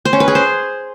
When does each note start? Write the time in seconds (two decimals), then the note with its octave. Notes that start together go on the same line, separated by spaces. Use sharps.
0.05 C5
0.13 C#4
0.20 B4
0.28 G#4
0.35 C5